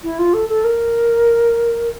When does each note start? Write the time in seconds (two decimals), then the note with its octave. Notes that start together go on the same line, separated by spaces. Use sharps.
0.03 E4
0.19 F4
0.34 A4
0.49 A4
0.64 A#4